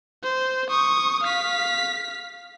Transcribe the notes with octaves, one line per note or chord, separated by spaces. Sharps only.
C5
C#6 D#6
F5 B6